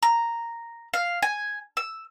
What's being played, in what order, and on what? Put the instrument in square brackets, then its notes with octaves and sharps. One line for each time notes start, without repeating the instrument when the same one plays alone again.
[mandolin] A#5
F5
G#5
E6